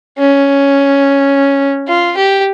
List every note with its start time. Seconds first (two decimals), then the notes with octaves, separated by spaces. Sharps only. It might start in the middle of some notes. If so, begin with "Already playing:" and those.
0.18 C#4
1.88 F4
2.17 G4